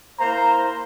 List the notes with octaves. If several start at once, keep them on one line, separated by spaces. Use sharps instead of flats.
A#3 E4 C5 A#5